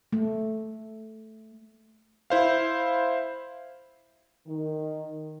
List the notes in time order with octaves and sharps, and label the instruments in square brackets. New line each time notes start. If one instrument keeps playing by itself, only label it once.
[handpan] A3
[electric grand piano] E4 C5 F5
[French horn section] D#3